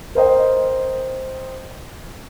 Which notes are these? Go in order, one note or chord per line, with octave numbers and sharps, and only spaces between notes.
A#4 C5 D#5 G5